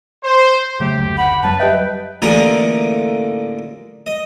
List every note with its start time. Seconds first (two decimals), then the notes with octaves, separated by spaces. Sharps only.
0.24 C5
0.80 C#3 F#3 A3 G4
0.98 F#1 D2
1.18 F#5 B5
1.43 F#2 F#3 G3 B4 A5
1.60 G4 B4 D#5 E5 G5
2.22 A1 A#2 D3 G#4 G#5 A#5
4.06 D#5